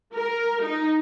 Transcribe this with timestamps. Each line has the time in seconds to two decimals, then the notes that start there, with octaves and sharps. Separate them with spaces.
0.13 A#4
0.63 D#4